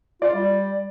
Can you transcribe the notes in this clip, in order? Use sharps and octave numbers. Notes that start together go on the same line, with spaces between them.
F4 D5
G3